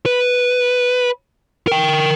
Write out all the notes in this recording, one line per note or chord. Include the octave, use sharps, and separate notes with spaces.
B4
A#4 G5